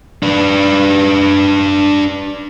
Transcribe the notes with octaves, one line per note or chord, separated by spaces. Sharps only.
D4 B4